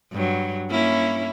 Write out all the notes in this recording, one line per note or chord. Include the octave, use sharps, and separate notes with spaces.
G2 F#3
A#3 C#4 E4